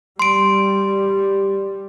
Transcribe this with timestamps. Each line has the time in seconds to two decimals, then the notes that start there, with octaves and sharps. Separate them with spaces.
0.19 G3 C6 D7